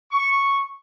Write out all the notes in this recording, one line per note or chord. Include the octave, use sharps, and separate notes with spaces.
C#6